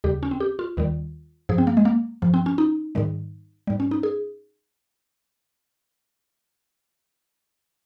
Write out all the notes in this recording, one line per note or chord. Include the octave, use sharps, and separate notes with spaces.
D#2 C#3 G3 G4
C#4
C4
G4
F4
D#2 D#3 G3
G2 F3 G#4
C4
A#3
G#3
A#3
G2 F3
C4
C#4
D#4
G#2 D#3 G3
G#2 G3
C#4
D#4
G#4